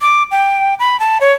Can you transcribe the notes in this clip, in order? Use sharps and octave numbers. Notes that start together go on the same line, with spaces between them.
D6
G5
B5
A5
C#5